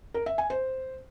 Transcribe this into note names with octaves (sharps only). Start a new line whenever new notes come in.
A#4
E5
G#5
C5